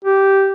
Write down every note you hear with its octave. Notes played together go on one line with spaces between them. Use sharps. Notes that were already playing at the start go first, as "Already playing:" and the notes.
G4